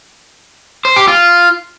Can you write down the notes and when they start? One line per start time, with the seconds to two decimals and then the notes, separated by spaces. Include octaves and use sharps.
0.85 C5
0.96 G4
1.08 F4